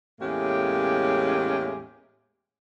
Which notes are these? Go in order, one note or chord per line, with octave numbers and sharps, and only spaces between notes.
E2 A2 G#3 A#3 C#4 G4